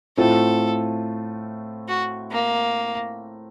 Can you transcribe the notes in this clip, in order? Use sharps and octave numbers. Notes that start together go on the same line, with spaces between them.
A2 A3 C4 F4 A4
F#4
A#3